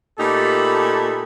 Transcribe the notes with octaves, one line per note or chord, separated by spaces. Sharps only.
A#2 A3 D#4 G4 A4 B5